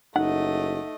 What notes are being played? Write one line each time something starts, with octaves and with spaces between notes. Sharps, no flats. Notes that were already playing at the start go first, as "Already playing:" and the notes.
F#1 A3 D#4 D#5 F#5